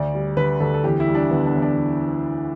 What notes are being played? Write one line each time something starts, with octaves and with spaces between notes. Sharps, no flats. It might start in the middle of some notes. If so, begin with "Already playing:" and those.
Already playing: D2 D5
G3
D3 B4
D2 A4
A4
E2 G4
E4
G3
D4
D3 B3
D4
E2
D4